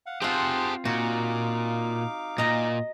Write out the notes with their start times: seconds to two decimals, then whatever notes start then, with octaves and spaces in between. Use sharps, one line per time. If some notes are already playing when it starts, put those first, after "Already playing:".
0.06 F5 F#5
0.22 C4 F4 G4 G#4 C5 F#5 A5
0.85 A#2 D#4 F#4 F5 D6
2.38 A#2 D#5 A#5